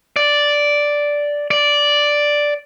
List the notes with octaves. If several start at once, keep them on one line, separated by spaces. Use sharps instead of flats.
D5
D5